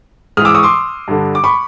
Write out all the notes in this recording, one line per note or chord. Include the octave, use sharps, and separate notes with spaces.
G#2 E3 D#6 F6
D6 E6
C#6 D#6
C6 D6
G2 D3
D6
B5 C#6